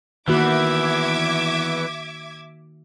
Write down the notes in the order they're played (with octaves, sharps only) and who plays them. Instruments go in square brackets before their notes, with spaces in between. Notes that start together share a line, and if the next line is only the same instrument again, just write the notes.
[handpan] D#3 A#3 F#4 [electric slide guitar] E3 B3 [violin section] E5 D6 G#6